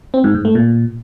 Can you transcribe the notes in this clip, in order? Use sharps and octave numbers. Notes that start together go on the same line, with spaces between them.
C4
G#2
G#2
A3
A#2